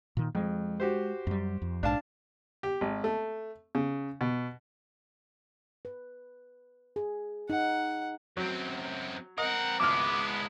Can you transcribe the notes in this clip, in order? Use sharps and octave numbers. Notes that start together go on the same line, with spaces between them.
A#2 D#3
F2 G#3
F#4 G4 C5
F#2 G3
F2
A#1 G#2 D4 F5 A5
G4
G#1
A3
C#3
B2
B4
G#4
D#4 F#5
F#2 F#3 C4
C4 A#4 D#5 F#5
G#1 C#2 G#3 B3 E4 D6 F6